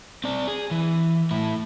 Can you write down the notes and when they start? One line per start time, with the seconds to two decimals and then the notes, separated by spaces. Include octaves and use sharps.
0.24 C4 D5
0.48 G#4
0.71 E3
1.31 A2 E4